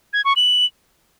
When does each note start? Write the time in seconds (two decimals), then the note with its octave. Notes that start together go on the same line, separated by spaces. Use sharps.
0.13 G#6
0.25 C#6
0.36 F#7